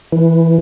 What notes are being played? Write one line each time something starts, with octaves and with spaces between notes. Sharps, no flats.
E3